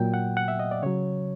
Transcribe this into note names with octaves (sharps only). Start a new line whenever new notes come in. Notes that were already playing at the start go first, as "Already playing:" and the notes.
Already playing: A#2 F#3 G5
F#5
F#5
E5
D#5
D5
C#3 F#3 C#5